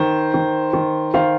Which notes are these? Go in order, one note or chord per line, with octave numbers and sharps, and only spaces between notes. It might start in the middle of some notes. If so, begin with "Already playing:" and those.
Already playing: D#3 C5
D#3
D#3
D#3 C5 F5